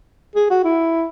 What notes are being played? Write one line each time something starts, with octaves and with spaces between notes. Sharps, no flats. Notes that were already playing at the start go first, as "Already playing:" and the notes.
G#4
F#4
E4